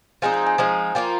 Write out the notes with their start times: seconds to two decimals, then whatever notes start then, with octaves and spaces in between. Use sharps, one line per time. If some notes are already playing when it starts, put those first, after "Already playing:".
0.22 F3 G#3 C4 D#4 G#5
0.34 A#5
0.47 G#5
0.58 F3 G#3 C4 D#4
0.95 F3 A#3 F4 G5